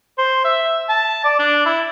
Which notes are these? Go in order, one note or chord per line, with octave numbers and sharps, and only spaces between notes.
C5
E5
A5
D5
D4
E4